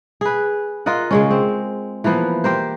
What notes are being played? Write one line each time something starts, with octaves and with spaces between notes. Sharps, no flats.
G#4 B4
F4 A#4 D#5 F#5
C#3 G#3 C#4
C4
E3 F3 A#3 B3
G4 A#4 C5